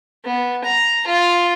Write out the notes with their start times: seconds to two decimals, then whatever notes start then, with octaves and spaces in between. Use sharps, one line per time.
0.25 B3
0.64 A#5
1.07 F4